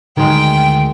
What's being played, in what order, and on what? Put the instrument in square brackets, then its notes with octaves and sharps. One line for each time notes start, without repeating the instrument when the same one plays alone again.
[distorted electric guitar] D2 [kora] D#3 G#3 [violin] G5